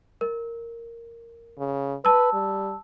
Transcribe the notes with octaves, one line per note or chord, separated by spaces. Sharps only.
A#4
C#3
B4 A5 E6
G3